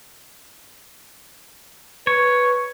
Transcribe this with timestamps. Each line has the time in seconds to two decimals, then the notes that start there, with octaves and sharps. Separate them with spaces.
2.07 B4 C#5